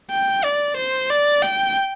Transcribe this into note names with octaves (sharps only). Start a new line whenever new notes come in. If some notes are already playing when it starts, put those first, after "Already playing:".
G5
D5
C5
D5
G5